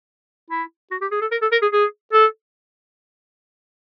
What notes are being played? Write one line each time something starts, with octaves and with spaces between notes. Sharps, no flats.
E4
F#4
G4
G#4
A4
A#4
A4
A#4
G#4
G#4
A4